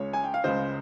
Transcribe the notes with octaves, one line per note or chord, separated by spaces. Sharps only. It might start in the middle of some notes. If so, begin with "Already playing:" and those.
Already playing: C#2 C#3 C#5
G#5
G5
F5
C#2 C#3 C5 D#5